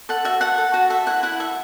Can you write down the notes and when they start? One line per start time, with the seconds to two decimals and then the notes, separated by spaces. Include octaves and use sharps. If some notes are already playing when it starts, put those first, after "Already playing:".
0.09 A4 F#5
0.25 F#4 E5
0.41 A4 F#5
0.58 A4
0.74 F#4
0.90 A4 E5
1.07 E4 F#5
1.23 E4 F#5
1.39 A4 E5